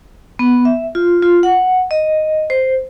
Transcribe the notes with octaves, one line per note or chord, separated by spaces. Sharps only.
B3
E5
F4
F4
F#5
D#5
C5